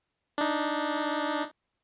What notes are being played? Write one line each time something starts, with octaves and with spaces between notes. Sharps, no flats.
D4 D#4